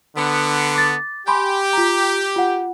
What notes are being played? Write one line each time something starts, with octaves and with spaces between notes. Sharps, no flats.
D3 B3
D6 A6
G4 G#5 B5 C6
F4 A#5
F4 F#5